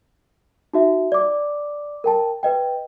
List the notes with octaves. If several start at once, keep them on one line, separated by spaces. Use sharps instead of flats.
D#4 F#4 E5
D5 D6
A#4 G5 A5
B4 D#5 G5